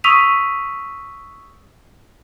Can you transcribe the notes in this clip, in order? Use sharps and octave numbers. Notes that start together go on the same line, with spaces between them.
C#6 D#6 E6 B6 D#7 F7